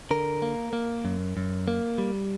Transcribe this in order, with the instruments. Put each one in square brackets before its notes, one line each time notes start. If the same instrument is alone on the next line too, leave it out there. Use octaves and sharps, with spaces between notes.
[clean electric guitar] D3 A#4
A#3
A#3
F#2
F#2
A#3
G3